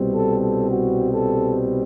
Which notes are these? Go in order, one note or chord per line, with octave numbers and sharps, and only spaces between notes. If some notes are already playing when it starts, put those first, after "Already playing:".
Already playing: C2 B2 G3 C4
A4
A4
F#4
A4